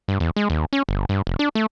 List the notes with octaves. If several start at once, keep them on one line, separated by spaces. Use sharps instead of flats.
G2
E2
G#3
D#2
C#4
G1
G2
F1
D4
A3